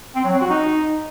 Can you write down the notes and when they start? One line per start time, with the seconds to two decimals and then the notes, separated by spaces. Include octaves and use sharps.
0.15 C4
0.24 F#3
0.32 C4
0.41 F#4
0.50 D#4